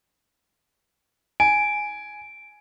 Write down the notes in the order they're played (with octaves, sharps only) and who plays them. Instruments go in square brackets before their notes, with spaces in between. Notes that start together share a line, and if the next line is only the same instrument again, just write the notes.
[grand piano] G#5 [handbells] D7